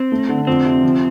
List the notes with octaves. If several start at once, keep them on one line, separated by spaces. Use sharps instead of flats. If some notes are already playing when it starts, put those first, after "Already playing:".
Already playing: C4
A3
D3
F2 C4
C3
F3